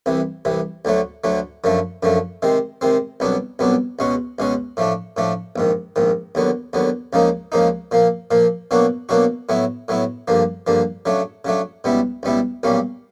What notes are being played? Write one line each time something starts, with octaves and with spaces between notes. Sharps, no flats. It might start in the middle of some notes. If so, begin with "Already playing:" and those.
C2 C3 E3
C2 C3 E3
D2 D3 F#3 A3
D2 D3 F#3 A3
F#2 D3 F3 A3
F#2 D3 F3 A3
C3 D#3 G#3 C4
C3 D#3 G#3 C4
C2 B2 F#3 B3 D4
C2 B2 F#3 B3 D4
C#2 B2 G#3 C#4 F#4
C#2 B2 G#3 C#4 F#4
A2 F3 A3 D4
A2 F3 A3 D4
A#1 G#2 D#3
A#1 G#2 D#3
D#2 D3 F#3 B3
D#2 D3 F#3 B3
C#2 C#3 F3 A#3 D#4
C#2 C#3 F3 A#3 D#4
A#2 F3 A#3
A#2 F3 A#3
B2 F#3 A#3 D4 F#4
B2 F#3 A#3 D4 F#4
A2 F#3 B3 E4
A2 F#3 B3 E4
G2 D3 F3 A#3
G2 D3 F3 A#3
C#3 F#3 A3 D4
C#3 F#3 A3 D4
C#2 B2 G3 B3 E4
C#2 B2 G3 B3 E4
B1 A#2 G3 A#3 C#4